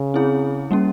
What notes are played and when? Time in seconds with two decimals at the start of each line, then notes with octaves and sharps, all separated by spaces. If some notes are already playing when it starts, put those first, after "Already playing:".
Already playing: C#3
0.14 C4 E4 G#4
0.71 G3 A#3 C#4